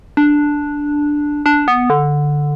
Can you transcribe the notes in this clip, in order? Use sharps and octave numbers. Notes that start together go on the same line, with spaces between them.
D4
D4
B3
D3